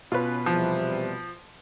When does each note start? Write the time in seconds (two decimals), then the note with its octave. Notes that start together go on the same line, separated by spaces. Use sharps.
0.12 B2 C#4 F4 B4
0.46 E2 C3 F3 G3